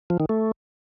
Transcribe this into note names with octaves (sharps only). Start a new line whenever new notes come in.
F3
D#3
A3